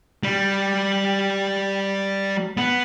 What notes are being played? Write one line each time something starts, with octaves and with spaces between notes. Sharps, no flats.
G3
B3